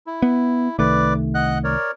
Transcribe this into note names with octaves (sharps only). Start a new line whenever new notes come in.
E4
B3
C2 D#3 A3 B4 D5 D6
D#5 F#5 F#6
A#4 C#5 D5